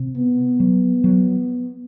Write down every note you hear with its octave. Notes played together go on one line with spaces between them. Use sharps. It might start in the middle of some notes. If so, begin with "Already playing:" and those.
Already playing: C3
B3
F#3
F#3